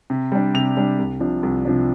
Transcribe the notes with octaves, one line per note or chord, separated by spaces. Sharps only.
C3
G3 D4
C3 F7
G3 D4
C2
C3 F3 D4
C2
C3 F3 D4